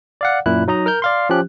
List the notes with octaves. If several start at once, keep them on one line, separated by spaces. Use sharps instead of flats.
D5 F5 F#5
F#2 A#2 E4 F#6
F#3 D#4 D#5 A#5
A#4 F6 G6
D5 F5 C6
F3 C#4 G4 F#6